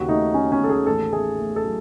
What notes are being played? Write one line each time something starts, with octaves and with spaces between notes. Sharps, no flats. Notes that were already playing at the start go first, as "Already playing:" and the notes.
Already playing: D#2 C#3 F#4
A3 D#4
A3 C#4
C#4
D#2 A4
G#4
A1 A4
A3 G#4
A3
A4
F#3